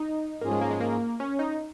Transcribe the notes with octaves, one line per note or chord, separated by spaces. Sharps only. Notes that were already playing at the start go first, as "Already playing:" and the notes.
Already playing: D#4
G#2 F3 A#3 C#4 F4 G#4
G#3
A#3
G#3
A#3
C#4
D#4